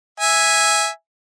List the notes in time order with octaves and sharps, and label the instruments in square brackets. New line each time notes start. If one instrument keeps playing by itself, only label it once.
[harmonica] E5 G#5